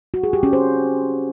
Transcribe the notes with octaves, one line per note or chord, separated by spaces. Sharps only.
F#4
G#4
G4
C#4
C5